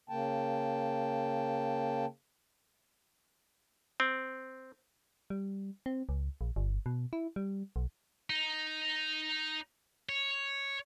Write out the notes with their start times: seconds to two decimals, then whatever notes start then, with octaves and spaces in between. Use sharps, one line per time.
0.09 C#3 A#3 G5 A5
4.00 C4
5.30 G3
5.86 C4
6.09 C#2
6.41 A#1
6.56 G1
6.86 B2
7.13 E4
7.36 G3
7.76 B1
8.30 D#4
10.09 C#5